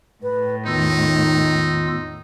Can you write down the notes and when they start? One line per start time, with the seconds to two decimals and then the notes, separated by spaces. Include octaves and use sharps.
0.23 A2 B4
0.66 E2 D#3 D#4 F4 E6